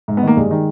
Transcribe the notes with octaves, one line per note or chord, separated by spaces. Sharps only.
G#2
B3
D#3 A#3
G2 G#3
D#3